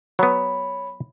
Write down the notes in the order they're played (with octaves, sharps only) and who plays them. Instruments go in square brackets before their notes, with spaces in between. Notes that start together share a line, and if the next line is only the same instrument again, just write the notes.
[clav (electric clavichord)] F#3 B3 [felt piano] C#5 [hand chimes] B5